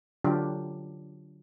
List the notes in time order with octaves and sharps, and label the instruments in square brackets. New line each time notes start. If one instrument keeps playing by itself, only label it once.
[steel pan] D3 F#3 D4 F4 G4